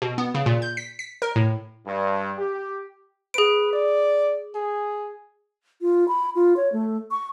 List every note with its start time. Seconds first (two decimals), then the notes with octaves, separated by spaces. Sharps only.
0.02 B2
0.18 B3
0.34 C#3
0.46 A#2
0.62 G6
0.77 B6
0.99 B6
1.22 A#4
1.36 A2
1.87 G2
2.39 G4
3.34 G#4 B4 D7
3.73 D5
4.55 G#4
5.81 F4
6.08 B5
6.35 F4
6.57 C#5
6.72 A3
7.11 C#6